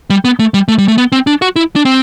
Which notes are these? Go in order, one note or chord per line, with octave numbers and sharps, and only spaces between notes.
G3
B3
A3
G3
A3
G3
A3
B3
C4
D4
F#4
E4
D4
C4